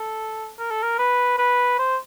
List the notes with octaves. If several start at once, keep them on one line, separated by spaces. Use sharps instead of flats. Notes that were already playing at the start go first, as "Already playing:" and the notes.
Already playing: A4
A#4
A4
A#4
B4
B4
C5